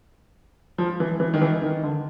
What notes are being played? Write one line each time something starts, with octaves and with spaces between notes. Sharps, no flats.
F3
E3
E3
D#3
E3
D#3
D3